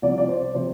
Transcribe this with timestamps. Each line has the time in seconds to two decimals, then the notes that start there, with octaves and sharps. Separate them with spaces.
0.02 C2 C3 F3 D5
0.18 D5
0.28 C5
0.55 C3 F3 C5